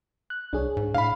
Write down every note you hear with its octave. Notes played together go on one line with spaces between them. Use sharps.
F#6
C2 D4 G#4 C#5
G#2
A2 F5 B5